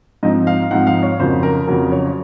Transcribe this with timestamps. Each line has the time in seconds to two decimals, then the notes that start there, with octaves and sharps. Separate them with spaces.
0.23 G#2 F3 C4 D#4 D#5
0.47 F5
0.71 G#2 F3 C4 D#4 F#5
0.87 F5
1.03 C#5
1.20 F2 C#3 F#3 A#3 C5
1.43 A#4
1.68 F2 C#3 F#3 A#3 A#4
1.92 C#5